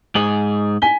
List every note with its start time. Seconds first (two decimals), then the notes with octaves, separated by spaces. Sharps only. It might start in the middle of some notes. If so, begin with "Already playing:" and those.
0.15 G#2 G#4 F#7
0.82 G#5 B6 G7